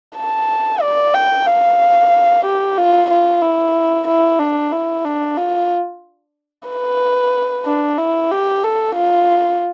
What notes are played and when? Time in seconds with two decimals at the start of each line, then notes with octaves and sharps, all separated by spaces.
0.16 A5
0.81 D5
1.14 G5
1.46 F5
2.45 G4
2.77 F4
3.10 F4
3.42 E4
4.07 E4
4.39 D4
4.72 E4
5.04 D4
5.37 F4
6.68 B4
7.66 D4
7.98 E4
8.31 G4
8.63 A4
8.95 F4